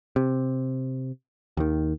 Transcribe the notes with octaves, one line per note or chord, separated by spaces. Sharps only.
C3
D#2 D#3